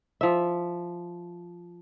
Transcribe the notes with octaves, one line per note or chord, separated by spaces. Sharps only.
F3 E5